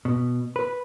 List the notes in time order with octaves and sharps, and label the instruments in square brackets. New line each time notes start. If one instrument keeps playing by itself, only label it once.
[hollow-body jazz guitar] B2
B4